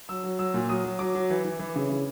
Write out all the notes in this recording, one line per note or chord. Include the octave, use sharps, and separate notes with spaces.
F#3 E6
F#3
F#3 E6
A#2
F#3 D#6
F#3
F#3 D6
F#3
E3
E3
E3
C#3
C#3